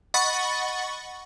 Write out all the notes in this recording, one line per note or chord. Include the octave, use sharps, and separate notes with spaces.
D#5 F#5 B5 C#6 A6